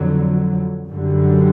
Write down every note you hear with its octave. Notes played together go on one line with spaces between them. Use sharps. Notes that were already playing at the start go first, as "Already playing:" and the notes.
Already playing: F2 D3 F#3
F#2 D3 G3